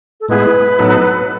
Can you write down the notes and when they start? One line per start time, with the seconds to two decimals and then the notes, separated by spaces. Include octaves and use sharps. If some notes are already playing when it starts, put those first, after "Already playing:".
0.21 A4
0.29 A2 G#3 B3 E4 G#4 B4
0.79 A2 F#3 B3 D#4 A4